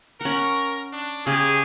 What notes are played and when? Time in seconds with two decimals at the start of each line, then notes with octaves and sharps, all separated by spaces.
0.21 C#4 A#4 F#5
0.93 D4
1.27 C#3 G4 G#4